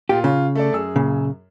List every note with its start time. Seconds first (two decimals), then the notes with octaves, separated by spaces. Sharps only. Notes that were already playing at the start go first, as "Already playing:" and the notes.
0.09 A#2 F4 G4
0.24 C#3 F4
0.55 A3 A4 D5
0.72 F#2 G#4 E6
0.96 A#2 C#3